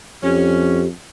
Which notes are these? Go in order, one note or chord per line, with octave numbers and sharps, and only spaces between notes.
F2 C#4 G4